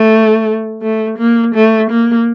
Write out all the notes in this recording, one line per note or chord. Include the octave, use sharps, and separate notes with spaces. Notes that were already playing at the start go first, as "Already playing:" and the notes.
Already playing: A3
A3
A#3
A3
A#3